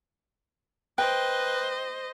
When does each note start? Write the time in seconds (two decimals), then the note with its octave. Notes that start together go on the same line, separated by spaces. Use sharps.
0.98 B4 C5 D#5 G5